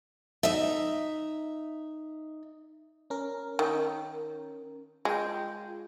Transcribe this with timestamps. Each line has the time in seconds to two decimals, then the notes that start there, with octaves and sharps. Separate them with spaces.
0.43 D#4 E5
3.10 C#4 A#4
3.59 D#3
5.05 G#3 F4 G5